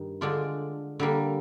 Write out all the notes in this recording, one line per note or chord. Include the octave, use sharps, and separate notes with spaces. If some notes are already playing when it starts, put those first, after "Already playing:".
Already playing: G2 D#3
D3 G#3 D4 F4
D3 G3 A#3